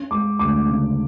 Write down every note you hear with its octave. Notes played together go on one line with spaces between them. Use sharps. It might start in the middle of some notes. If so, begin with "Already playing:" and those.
Already playing: C#4
G#3 D6
D2 D6
C#3